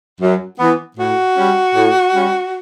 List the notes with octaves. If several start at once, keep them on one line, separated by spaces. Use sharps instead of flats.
F#2
E3 B3
A2 F#4
G3 C#4
A2
G3 C#4